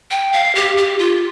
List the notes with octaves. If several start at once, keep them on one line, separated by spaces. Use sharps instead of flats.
G5
F5
G4
G4
F4